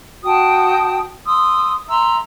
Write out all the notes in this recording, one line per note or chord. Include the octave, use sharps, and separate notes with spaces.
F#4 G5 A5 D#6
C6 D#6 E6
E5 A#5 C6 E6